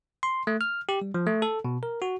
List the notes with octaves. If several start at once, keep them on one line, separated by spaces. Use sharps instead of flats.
C6
A3
F6
G4
G3
F3
A3
A4
B2
A#4
F#4